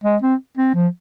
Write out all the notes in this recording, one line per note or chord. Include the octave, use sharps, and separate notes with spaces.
G#3
C4
C4
F3